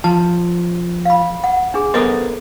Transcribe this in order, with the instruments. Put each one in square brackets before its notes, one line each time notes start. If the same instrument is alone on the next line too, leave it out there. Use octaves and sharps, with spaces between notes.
[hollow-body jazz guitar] F3 [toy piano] A5
[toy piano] F5 B5
F#5
D4 G#4
[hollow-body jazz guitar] B3 A#4 C5 [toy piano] A4 D#5